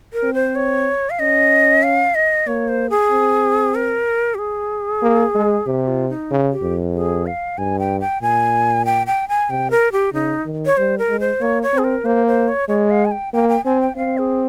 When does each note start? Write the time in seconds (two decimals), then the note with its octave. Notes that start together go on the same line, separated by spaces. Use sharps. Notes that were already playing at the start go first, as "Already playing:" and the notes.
0.13 A#4
0.23 C4
0.34 C5
0.56 C#5
1.10 F5
1.19 C#4 D#5
1.83 F5
2.15 D#5
2.47 A#3 C#5
2.68 C5
2.90 G#4
3.11 C4
3.75 A#4
4.35 G4
4.38 G#4
5.02 A#3
5.35 G#3
5.66 C3 G4
5.88 F4
6.09 D#4
6.31 C#3
6.51 G4
6.62 F2
6.94 G#4
7.26 F5
7.58 G2 G#5
7.79 G5
8.01 G5
8.21 A#2 G#5
8.85 G5
9.07 G5
9.29 G#5
9.49 C3 G5
9.71 A#4
9.92 G4
10.13 C#3 D#4
10.45 D#3
10.66 C#5
10.77 G3 C5
10.98 A#4
11.09 G#3
11.20 C5
11.41 A#3 C#5
11.63 C#5
11.73 C4
11.78 G#4
11.84 A#4
12.05 A#3 C5
12.27 C5
12.48 C#5
12.68 G#3 C#5
12.90 F5
13.05 G#5
13.11 G5
13.33 A#3 G5
13.49 G5
13.65 C4 G#5
13.81 G5
13.97 C4 F5
14.18 G#4